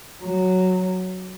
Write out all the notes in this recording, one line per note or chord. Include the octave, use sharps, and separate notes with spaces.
F#3